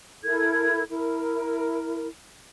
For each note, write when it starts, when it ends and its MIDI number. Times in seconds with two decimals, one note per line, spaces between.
0.23 0.82 64
0.23 0.82 69
0.23 0.82 70
0.23 0.82 92
0.90 2.08 64
0.90 2.08 70